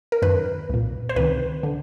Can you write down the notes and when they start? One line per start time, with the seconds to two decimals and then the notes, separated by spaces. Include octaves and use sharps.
0.12 A#4
0.22 F#2 D#3 B4
0.69 C2 A#2
1.09 C5
1.16 C#2 C3 D#3 B4
1.63 D3